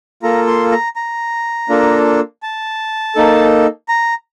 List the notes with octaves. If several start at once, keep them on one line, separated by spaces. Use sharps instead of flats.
A#3 F4 A4 A#5
C6
A#5
A#5
A#3 D4 F4 A4
A5
A#3 D#4 A4
A#5